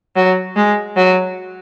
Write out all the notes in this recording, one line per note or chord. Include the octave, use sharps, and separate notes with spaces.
F#3
G#3
F#3